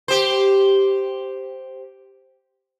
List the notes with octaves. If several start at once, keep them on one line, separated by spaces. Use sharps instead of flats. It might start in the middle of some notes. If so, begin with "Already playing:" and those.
G4 C5